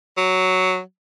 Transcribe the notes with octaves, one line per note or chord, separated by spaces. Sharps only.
F#3